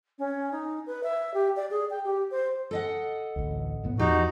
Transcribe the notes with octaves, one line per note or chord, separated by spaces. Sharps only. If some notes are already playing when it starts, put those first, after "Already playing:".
C#4
D#4
B4
E5
G4
D5
G#4
G5
G4
C5
A4 D#5 F#5
A1 D2
A1 A2 B3
E2 F3 D#4 F#4 G4